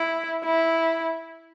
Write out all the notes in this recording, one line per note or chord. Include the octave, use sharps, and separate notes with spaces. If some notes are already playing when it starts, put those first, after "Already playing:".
Already playing: E4
E4